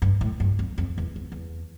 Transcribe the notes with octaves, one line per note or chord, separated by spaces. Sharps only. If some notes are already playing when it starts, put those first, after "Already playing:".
G2
A2
G2
F2
F2
E2
E2
E2